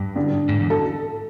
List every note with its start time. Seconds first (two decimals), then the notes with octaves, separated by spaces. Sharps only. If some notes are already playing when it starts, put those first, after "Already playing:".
Already playing: G2
0.16 D3 D4
0.49 G#2
0.60 E2
0.70 A4